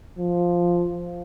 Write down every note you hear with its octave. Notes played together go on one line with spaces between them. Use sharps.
F3